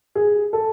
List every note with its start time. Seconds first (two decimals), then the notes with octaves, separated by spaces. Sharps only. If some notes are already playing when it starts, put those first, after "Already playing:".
0.15 G#4
0.53 A4